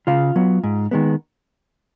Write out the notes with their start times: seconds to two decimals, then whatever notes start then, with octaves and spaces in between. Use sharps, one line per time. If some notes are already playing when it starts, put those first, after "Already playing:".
0.07 C#3 F4 F5
0.36 F#3 B3
0.63 G#2
0.91 D#3 G#3 B3